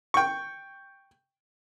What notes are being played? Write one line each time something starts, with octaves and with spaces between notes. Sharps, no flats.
G5 C#6